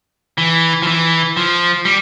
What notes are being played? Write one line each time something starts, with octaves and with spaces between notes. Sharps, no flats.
E3
F3
E3
F3
G3